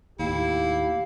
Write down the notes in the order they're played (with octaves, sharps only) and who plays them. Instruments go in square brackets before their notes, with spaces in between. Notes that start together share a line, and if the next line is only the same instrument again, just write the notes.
[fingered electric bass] D#2 A2 [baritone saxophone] E4 [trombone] G4 [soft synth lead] F5